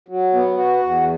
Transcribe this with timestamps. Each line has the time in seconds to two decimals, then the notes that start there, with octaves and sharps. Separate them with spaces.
0.08 F#3
0.34 B3
0.58 F#4
0.83 E2